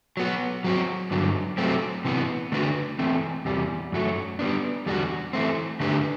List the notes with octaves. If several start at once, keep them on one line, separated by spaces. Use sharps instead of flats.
F#3 B3 F#4
F#3 C4 F#4
G2 D3 F#3
C3 F#3 A3 C4
C3 E3 B3
D3 A3 D4 F#4 B4
E3 A3 C4
E2 C3 G3
F#2 F#3 A3
G3 B3 D4
E2 D3 G3 D4 F#4
E3 A3 C4
D3 A3 D4 G4 B4